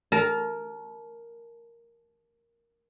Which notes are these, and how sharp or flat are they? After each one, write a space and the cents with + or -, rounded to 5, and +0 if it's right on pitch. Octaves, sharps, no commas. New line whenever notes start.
A#4 +0 A5 -30